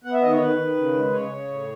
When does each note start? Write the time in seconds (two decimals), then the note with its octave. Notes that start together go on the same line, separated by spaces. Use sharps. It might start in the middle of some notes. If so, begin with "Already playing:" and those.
0.04 B3 F#5
0.13 E5
0.22 D#3 D#5
0.31 C#5
0.40 D#3 B4
0.59 D#3
0.76 C#3
0.94 G#3
1.12 C#3 C#5
1.30 C#3
1.48 A2